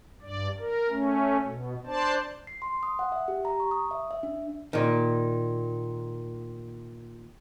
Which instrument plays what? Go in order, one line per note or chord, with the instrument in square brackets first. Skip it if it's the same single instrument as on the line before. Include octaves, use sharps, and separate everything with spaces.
[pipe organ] G2 D5
A#4
A3 C#4
B2
D4 C5 D5 A5
[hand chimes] C7
C6
D#6
F#5
E5
G4
A#5
C#6
D#6
E5
E5
D4
[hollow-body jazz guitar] A#2 D#3